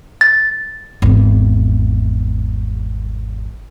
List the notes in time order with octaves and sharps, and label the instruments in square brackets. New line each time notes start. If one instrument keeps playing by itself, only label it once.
[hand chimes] A6
[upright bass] G#1 E2